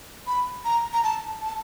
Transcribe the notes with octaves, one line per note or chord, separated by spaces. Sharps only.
B5
A#5
A#5
A5
A5